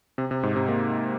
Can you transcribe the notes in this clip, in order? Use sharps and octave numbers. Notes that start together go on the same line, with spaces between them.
C3
C3
G#2
C3
A#3